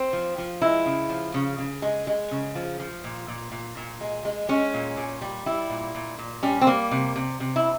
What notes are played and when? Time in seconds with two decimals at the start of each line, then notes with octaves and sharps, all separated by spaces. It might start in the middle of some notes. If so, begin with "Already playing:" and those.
Already playing: C4
0.13 F3
0.38 F3
0.62 G#3 E4
0.86 C#3
1.09 F3
1.34 C#3
1.59 C#3
1.82 G#3
2.07 G#3
2.31 C#3
2.55 F3
2.80 F3
3.04 A#2
3.28 A#2
3.52 A#2
3.77 A#2
4.01 G#3
4.25 G#3
4.49 G#3 C#4
4.74 A#2
4.97 A#2
5.22 G3
5.46 G3 E4
5.70 A#2
5.95 A#2
6.19 A#2
6.43 G3 C#4
6.61 C4
6.67 G3 A#3
6.91 C3
7.16 C3
7.40 C3
7.56 E4